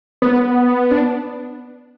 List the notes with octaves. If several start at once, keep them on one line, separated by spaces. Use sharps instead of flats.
B3
D4